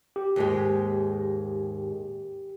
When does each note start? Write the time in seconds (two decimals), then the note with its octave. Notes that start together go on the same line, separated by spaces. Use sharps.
0.16 G4
0.36 D#2 G#2 G#3